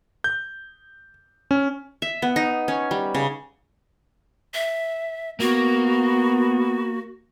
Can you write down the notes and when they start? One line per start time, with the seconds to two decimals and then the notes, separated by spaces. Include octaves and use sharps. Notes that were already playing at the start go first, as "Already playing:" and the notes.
0.24 G6
1.51 C#4
2.02 E5
2.22 B3
2.36 D#4
2.68 C#4
2.91 G3
3.15 C#3
4.54 E5
5.40 A#3 B3 F#4